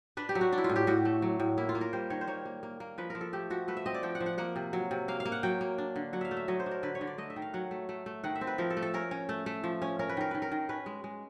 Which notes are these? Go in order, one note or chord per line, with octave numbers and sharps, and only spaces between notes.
D4 B4
G4
F#3
F#4
D4
E4
F4
A2
G4
A2 F#4
A3
F#3
A2
A#3 E4
F4
A#3
A#4
G3 C5
D#3 C#5
C5
A#3 C#5
A#3
A#3
A#3
F3 B4
F3 A#4
A4
A3 G4
F3 F#4
A3 B4
E5
C4 D#5
D5
F3 G5
F#5
F3
F#5
A#3 F#5
C3
F#3
C3
A#3 F5
F5
A#3
F#5
F#3 G5
A#3
D4
D3
F#3 F#5
E5 F5
A3
E5
F#3 D#5
C5
D4
A#4
D3 B4
C#5
D3
D5
A3 D#5
E5
D#3
F5
F#3 F#5
A3
A3
A3
D#3 F#5
E5
C4
B4
F3 A#4
A4
A3
A4
C#4 A#4
C#4
A3
A3
F3
C#4
C#4 A#4
B4
D#3 A#4
D#3 B4
A#4
D#3
C#4 B4
G#3
G#3